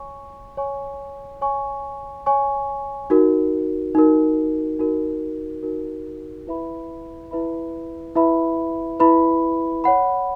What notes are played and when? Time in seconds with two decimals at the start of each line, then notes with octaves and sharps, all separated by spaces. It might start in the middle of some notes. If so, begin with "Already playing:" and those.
Already playing: C#5 G#5 C#6
0.57 C#5 G#5 C#6
1.41 C#5 G#5 C#6
2.26 C#5 G#5 C#6
3.10 D#4 F#4 A#4
3.95 D#4 F#4 A#4
4.79 D#4 F#4 A#4
5.63 D#4 F#4 A#4
6.47 E4 B4 E5 B5
7.31 E4 B4 E5 B5
8.15 E4 B4 E5 B5
9.00 E4 B4 E5 B5
9.84 C#5 F#5 B5